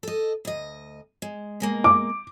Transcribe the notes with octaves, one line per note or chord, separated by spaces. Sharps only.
A4 D#5
D2 D#5
G#3
B2 G#3 A#3
D6